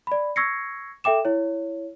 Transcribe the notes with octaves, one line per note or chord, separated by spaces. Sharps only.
D5 B5
C#6 E6 G#6 A#6 C7 C#7
A4 E5 G5 D6 E7
E4 C#5